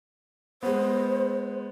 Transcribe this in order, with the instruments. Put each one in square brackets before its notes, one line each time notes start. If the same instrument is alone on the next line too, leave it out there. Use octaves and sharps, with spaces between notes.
[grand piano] G#3 B3 [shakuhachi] C5